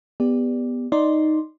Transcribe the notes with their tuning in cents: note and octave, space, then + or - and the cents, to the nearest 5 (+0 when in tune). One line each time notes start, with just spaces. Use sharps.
B3 +0 G4 +30 D5 +0
D#4 +0 D5 +0 C6 +0